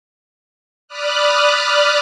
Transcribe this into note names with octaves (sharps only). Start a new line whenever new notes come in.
D5 B5 D6 D#6 F6 F#6